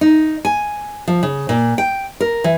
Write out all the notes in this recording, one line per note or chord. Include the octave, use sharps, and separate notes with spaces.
D#4
G#5
F3
C#3
A#2
G5
A#4
E3